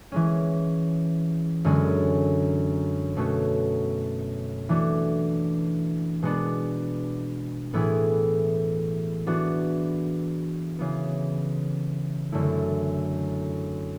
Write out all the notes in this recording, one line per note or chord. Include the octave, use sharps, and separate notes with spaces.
E3 G#3 C#4
F#2 D3 G#3 C#4
B2 A3 C#4 F#4
E3 A3 D4 F#4
B2 G#3 B3 D4
A2 E3 B3 E4 G#4
E3 B3 D4 F#4
C#3 E3 B3
F#2 D3 A3 E4